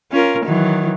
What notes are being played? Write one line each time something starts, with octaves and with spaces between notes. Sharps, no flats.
C#4 F4 A#4
D#3 E3 F#3